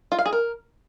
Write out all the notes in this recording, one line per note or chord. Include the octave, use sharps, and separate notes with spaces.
F4
F5
G#4
A#4